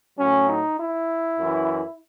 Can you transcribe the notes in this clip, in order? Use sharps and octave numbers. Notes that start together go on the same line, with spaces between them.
A2 F#3 C#4
D#4
E4
F#2 E3